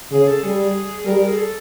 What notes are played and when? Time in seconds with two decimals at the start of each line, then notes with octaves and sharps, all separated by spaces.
0.11 C#3 G#4
0.27 A4
0.43 G3 G#4
1.06 G3 A#4
1.28 G#4
1.37 A4